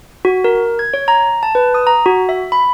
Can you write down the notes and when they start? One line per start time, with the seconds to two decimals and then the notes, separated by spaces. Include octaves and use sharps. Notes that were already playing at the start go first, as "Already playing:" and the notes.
0.25 F#4
0.44 A#4
0.79 G#6
0.94 C#5
1.08 A#5
1.43 A5
1.55 B4
1.74 D#6
1.87 A#5
2.06 F#4
2.29 E5
2.52 B5